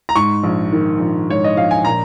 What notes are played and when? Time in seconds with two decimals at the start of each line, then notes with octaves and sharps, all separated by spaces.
0.09 A#5
0.16 G#2 C#6
0.44 A#1
0.72 D#3
1.00 A#1
1.29 G#2 C#5
1.44 D#5
1.57 A#1 F5
1.71 G#5
1.85 A#2 A#5